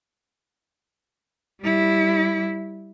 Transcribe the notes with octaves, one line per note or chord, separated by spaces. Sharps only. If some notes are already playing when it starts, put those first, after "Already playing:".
G3 E4